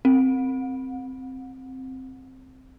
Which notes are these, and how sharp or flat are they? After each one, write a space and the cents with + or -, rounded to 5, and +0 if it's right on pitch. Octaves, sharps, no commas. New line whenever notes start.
C4 +0